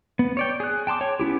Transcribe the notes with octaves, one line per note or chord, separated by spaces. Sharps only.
B3
C#5 D5 G5
G#4 F#6
G5 A5 C6 D6
C#5 G5
B3 C#4 E4 G4